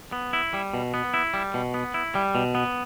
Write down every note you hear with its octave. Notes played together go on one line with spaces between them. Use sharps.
B3
E4
G3
B2
B3
E4
G3
B2
B3
E4
G3
B2
B3